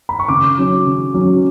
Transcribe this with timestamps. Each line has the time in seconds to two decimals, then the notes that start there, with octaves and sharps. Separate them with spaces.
0.09 B5
0.19 C#6
0.28 C#3 D6
0.58 F#3 C#4
0.87 C#3
1.14 F#3 C#4